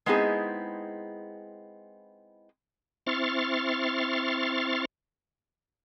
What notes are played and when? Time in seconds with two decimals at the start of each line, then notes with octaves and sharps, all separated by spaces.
0.06 G#3 B3 C4 D#4 E4 G#4
3.06 C4 E4 C6 C#6 F6 A6